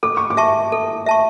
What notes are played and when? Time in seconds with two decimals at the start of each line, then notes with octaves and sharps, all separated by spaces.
0.03 A4 D6
0.17 C#6
0.30 D6
0.37 E5 A5 C#6
0.72 A4
1.06 E5 A5 C#6